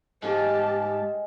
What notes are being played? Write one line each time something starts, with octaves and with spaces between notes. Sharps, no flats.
G#2 G#3 G4 G#4 F5 A5